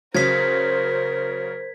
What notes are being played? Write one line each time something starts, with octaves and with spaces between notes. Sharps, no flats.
C#3 F#3 A#4 C5 G#6 B6